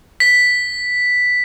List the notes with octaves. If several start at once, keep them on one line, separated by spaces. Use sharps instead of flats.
B6